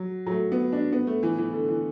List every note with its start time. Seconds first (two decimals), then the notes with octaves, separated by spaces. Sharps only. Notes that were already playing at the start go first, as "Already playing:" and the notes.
Already playing: F#3
0.27 F#3
0.31 A3
0.52 B3
0.72 D4
0.92 B3
1.07 A3
1.23 E3
1.38 E3
1.53 D3
1.69 E3